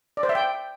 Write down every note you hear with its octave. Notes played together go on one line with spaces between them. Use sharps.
D5
C5
E5
G5